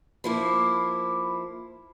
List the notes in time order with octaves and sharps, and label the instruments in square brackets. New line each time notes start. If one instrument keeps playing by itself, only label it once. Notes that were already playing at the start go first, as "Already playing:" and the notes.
[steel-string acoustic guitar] F3 A#3 E4 [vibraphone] B5 D6